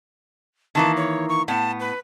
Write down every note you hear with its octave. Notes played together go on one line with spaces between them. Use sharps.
D#3 E3 A#3 A5
C#5
C#6
A2 B3 A5
B4